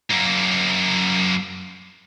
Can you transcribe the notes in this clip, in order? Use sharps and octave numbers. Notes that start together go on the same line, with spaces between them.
F#2 A#3